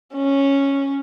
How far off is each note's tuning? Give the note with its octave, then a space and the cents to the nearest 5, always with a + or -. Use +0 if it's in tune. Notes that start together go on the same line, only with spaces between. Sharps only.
C#4 -5